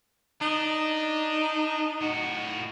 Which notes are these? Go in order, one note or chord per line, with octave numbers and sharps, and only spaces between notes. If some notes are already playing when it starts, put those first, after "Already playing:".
D4 D#4
A2 F#4